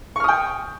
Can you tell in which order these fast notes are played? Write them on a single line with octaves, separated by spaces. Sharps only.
C#6 F6 D#6 G5